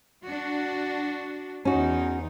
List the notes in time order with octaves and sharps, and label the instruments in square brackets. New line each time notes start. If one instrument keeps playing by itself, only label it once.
[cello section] D4 F#4
[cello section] E2 D#4 [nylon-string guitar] C#4 F#4